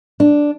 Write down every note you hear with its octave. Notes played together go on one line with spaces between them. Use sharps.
D4